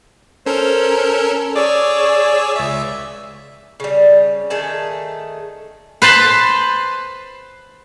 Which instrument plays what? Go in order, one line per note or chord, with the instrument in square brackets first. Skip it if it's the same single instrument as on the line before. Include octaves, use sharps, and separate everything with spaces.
[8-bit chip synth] C#4 A4 A#4 [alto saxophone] C5
[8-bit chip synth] G#4 C#5 E6 [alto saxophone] D5
[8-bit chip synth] C#2 E5
[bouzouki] C#3 G3
D#3 A3 G#4 A5
[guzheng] B4 C5 A5 B5 C6